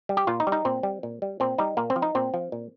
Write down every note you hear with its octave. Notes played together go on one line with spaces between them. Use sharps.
G3
G4
A#2 F4
D#4
G3
D#4
A#2 C4
G3
A#2
G3
A#2 C4
G3 D#4
A#2 A#3
C4
F3
D#4
A#2 C4
F3
A#2